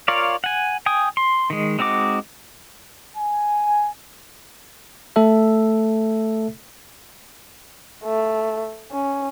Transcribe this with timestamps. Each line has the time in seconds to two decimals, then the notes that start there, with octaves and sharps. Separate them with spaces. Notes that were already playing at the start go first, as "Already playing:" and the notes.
0.08 F4 A#4 C#5 D5 F5
0.44 F#5 G#5
0.86 G5 G#5 D#6
1.17 C6
1.50 D#3 G#3
1.79 G#3 C4 D#4 F#4 D6
3.17 G#5
5.16 A3 A4 E5
8.05 A3
8.92 C#4